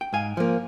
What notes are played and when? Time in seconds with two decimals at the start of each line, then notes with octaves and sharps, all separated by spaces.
0.01 G5
0.13 G#2 F5 G#5
0.37 F3 A#3